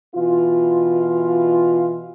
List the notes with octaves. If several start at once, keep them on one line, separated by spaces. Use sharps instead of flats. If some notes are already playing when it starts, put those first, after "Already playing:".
B2 E3 F4